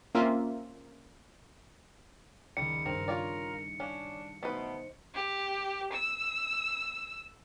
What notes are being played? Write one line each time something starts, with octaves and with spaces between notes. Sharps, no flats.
A#3 C4 C#4 F4 A#4 E5
C#2 D#3 G3 C#7
G2 C4 A#4
F4 C#5 D5
C#4 D4 F5
B2 A3 D#4 B4 C5 D#5
G4
E6